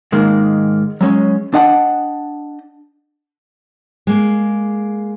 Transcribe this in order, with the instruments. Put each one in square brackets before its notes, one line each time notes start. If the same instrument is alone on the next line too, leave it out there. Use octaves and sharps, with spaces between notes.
[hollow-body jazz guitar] G#2 D#3 G#3 A#3
F#3 G#3 C4 C#4
D4 D#5 F#5 G5 A5
[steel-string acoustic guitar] G#3 A#3